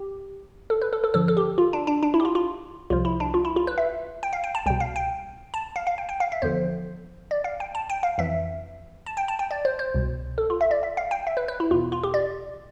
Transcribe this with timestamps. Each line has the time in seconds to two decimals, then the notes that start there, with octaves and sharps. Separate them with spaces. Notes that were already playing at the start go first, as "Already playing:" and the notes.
Already playing: G4
0.70 A4
0.82 B4
0.93 A4
1.04 A4
1.14 G2 D3 F3 A4
1.28 A4
1.37 G4
1.58 F4
1.73 D4
1.87 D4
2.03 D4
2.14 E4
2.20 G4
2.25 F4
2.35 F4
2.90 C2 C3 F3 F4
3.05 E4
3.20 D4
3.34 F4
3.45 E4
3.56 F4
3.67 B4
3.78 E5
4.23 G5
4.33 F5
4.44 G5
4.55 A5
4.66 C2 B2 G5
4.80 F5
4.96 G5
5.54 A5
5.76 F5
5.87 F5
5.98 G5
6.09 G5
6.20 F5
6.32 E5
6.42 E2 D3 F3 C5
7.31 D5
7.44 F5
7.60 G5
7.75 A5
7.90 G5
8.03 F5
8.18 F2 E3 E5
9.06 A5
9.17 G5
9.28 A5
9.39 G5
9.51 D5
9.65 C5
9.79 C5
9.94 C2 B2
10.38 A4
10.50 F4
10.61 E5
10.71 D5
10.83 E5
10.97 F5
11.11 G5
11.27 E5
11.37 B4
11.48 B4
11.60 E4
11.71 E2 F4
11.74 B2
11.92 F4
12.03 G4
12.14 D5